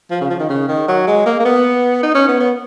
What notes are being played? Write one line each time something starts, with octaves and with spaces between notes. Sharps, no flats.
F3
C#3
F3
D#3
C#3
D#3
F#3
G#3
A#3
A#3
B3
D#4
C#4
B3
B3